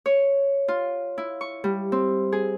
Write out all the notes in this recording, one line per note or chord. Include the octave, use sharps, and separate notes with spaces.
C#5
F4
E4
C#6
G3
C4
G#4